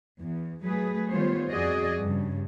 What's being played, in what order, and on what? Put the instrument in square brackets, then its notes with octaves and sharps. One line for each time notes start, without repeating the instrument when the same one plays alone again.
[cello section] E2
F#3 A3 G#4 B4
D#3 G3 B3 F4 C5 C#5
F2 F#4 G#4 D5 D#5
G2 C#3